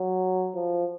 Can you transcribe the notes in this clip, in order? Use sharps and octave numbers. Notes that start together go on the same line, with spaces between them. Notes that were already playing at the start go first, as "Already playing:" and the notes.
Already playing: F#3
F3